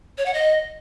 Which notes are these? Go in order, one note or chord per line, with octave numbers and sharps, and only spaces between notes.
C#5
F#5
D#5